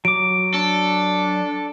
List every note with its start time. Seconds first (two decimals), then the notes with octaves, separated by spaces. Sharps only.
0.05 F#3 D6 D7
0.54 D4 A4